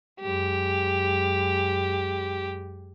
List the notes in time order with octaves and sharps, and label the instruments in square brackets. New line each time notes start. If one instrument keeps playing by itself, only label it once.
[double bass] F#2 G#3 [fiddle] G4